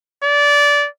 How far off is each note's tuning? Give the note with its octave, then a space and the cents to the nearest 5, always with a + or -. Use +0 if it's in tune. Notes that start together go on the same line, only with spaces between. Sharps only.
D5 -20